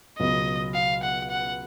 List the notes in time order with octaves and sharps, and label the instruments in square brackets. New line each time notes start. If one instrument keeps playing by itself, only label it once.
[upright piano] C#2 B2 F#3 [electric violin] D#5
[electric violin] F5
F#5
F#5